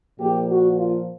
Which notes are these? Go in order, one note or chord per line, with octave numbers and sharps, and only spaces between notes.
A#2 F3 A#3 G4
F#4
F4